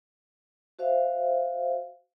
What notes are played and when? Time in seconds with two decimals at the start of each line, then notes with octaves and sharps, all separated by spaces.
0.79 F#4 C5 E5 F5